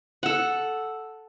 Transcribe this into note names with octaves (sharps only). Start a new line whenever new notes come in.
A4 F#5